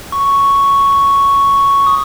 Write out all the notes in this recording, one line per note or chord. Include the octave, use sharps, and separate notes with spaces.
C#6
D#6